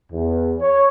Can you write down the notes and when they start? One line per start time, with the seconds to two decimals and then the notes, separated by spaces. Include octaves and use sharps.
0.12 E2
0.60 C#5